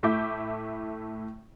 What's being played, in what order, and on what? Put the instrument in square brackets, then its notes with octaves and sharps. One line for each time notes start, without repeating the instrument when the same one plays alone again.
[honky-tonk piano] A2 A3 E4 E5 D6 G6